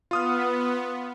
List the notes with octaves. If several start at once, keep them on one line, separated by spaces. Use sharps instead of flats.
B3 F4 D#6 F6